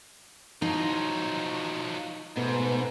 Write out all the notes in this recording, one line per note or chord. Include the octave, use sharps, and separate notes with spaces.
F3 F#3 D#4
G#2 B2 A3 B3